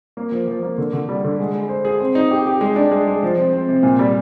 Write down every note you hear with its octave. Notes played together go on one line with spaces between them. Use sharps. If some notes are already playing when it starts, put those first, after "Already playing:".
A#3
F3
F3
A#3
D3
D3
G3
D3
G#3
G#3
C5
G#4
C4
D#4
G4
G4
G#3
D4
G#3
G#3
F3
C4
C4
C3
A#2
G3